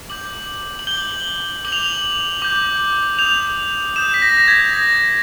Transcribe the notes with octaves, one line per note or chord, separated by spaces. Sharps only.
D6 G6 F#7
F#7
D6 G6 G7
D6 G6 F#7
F7
F#7
D6 G6
D#6 G6 F7
D#6 G6 E7
B6
A#6
G6
G#6
D#6 G6 A#6